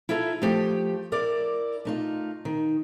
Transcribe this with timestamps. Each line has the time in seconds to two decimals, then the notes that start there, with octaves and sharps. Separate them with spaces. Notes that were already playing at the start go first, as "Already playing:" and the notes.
0.09 E4 F4 A4 E5 A#5
0.42 F3 A3 G4
1.12 E4 A#4 D5
1.85 A3 D#4 F4
2.45 D#3